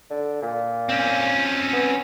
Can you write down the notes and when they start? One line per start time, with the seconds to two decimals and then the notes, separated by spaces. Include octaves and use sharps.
0.10 D3
0.43 A#2
0.89 C4 C#4
1.73 B3